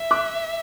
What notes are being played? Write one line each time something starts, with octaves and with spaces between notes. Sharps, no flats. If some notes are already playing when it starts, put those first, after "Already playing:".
Already playing: E5
D6 F#6